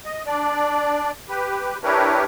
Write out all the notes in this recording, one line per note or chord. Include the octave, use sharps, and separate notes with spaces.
D#5
D4 D5
G4 B4
D4 E4 G4 A#4 B4 C#5